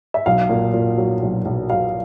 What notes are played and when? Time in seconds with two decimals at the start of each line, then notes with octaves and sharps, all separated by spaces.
0.14 E5
0.26 B1 F5
0.49 A#2
0.74 A#2
0.98 F#3
1.22 B1
1.45 B1
1.70 F#3 F5